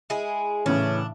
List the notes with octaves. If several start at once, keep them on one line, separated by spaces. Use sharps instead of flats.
G#3 E4 G#4
A2 C#3 E3 C#4 D4